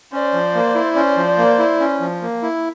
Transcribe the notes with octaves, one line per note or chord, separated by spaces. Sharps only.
C#4 C5 D5
F3
A#3
E4
C#4 C5 D5
F3
A#3
E4
C#4
F3
A#3
E4